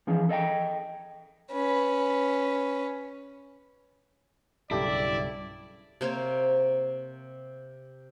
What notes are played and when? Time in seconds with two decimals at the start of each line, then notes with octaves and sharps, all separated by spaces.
0.07 E3 F3 C#4 G#4
0.29 A4 D#5 F5 G5
1.52 C#4 B4
4.71 B1 G2 C#3 E4 G4 A4 D5
6.01 C3 A#3 C5 C#5